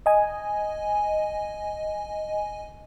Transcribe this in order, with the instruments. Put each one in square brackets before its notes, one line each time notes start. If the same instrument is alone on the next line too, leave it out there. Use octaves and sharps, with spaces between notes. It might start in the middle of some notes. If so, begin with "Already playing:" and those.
[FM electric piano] D#5 G#5